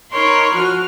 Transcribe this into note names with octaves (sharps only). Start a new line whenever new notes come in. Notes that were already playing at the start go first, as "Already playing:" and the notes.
D#4 A#4 C#5 B5 C6
F3 F4 F#4 F6